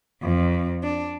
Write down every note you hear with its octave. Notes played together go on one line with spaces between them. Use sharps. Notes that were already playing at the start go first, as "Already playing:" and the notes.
F2
D4